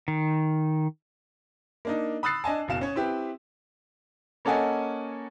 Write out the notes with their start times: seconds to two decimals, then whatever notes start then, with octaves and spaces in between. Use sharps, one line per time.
0.08 D#3
1.85 A#3 D4 D#4
2.23 B5 D#6 E6 F#6 A6 C7
2.44 D4 D#5 G#5 A5
2.68 F#1 B2 F5 E7
2.81 C#4 C#5
2.96 C4 E4 G4 B4
4.45 A#3 C#4 A4 D#5 F#5 G#5